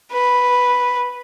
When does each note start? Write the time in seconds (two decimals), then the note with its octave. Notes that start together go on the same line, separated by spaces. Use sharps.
0.12 B4